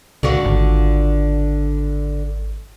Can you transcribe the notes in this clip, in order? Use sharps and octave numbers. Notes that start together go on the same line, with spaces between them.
C#2 D3 F4 F#4
G#1